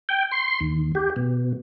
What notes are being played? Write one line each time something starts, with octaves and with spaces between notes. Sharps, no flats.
G5
C6
D#2
G4
B2